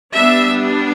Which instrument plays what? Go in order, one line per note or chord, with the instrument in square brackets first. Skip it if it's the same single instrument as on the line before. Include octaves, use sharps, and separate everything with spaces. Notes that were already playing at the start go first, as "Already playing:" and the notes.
[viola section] G3 B3 D4 E5